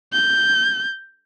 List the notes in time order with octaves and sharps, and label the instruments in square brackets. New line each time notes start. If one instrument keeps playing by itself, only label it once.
[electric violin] G6